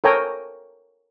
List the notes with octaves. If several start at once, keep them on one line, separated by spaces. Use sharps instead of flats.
A4 A#4 C#5 G5 G#5 A#5